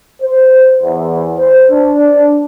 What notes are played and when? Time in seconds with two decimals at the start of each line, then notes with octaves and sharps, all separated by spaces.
0.22 C5
0.82 E2
1.38 C5
1.71 D4